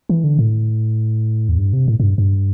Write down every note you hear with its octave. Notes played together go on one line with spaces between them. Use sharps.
E3
D3
A2
E2
G2
C3
A2
A2
G2
G2